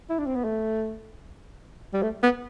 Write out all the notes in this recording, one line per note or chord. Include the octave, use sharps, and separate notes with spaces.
E4
D4
C4
B3
A3
G3
A3
B3